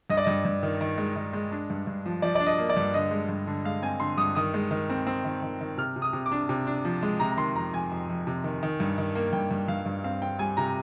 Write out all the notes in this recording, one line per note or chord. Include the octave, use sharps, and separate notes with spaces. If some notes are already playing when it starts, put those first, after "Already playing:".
G2 D#5
D5
G2 D#5
G2
D#3
D#3
G#3
D#3
G#3
D4
G2
G2
F3
F3 D5
D4 D5
D#5
A#3
D5
G2
D3 D#5
G#3
G2
D3
G#3 F5
C4 G#5
D3 C6
G2 D#6
D#3 D#6
G#3
D#3
C4
C4
D#3
D#3
D#3
C3 F6
C3
D#6
C3
D6
D4
C3
D4
F3
G#3
C3 A#5
A#5
D#3 C6
F2 A#5
F2 G#5
F2
F2
C3
D#3
D#3
G2
D#3
A#3
G2 G5
G2
G2 F5
G2
C4 F5
C4 G5
G3 G#5
C3 A#5